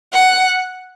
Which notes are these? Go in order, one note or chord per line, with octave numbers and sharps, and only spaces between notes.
F#5